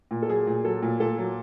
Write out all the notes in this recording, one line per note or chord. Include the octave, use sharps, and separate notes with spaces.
A#2
A4
F#3 G#4
A#2
F#3 A4
A#2
A#2 A4
F#3